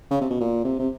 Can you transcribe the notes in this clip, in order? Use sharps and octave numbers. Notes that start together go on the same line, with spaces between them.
C#3
C3
B2
A#2
C3
C3